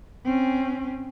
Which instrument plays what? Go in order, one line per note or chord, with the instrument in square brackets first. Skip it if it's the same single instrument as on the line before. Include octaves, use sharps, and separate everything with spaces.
[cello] C4 C#4